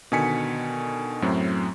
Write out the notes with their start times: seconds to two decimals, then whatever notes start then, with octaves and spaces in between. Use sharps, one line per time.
0.12 B2 D3 D#3 G#5 B6 C#7
1.22 F#2 A2 F#3 C4